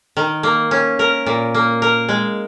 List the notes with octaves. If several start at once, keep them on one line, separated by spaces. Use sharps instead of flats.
D#3
A#3
C#4
A#4
A#2
A#3
A#4
G#3